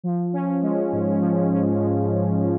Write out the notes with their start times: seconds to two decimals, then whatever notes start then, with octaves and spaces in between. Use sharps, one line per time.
0.04 F3
0.33 C#4
0.62 G#3
0.92 G#2
1.21 F3
1.52 C#4
1.80 G#3